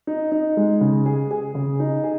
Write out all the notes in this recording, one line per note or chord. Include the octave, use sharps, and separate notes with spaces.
D#4
D#4
G#3
C#3
G#4
G#4
C#3
D#4
G#4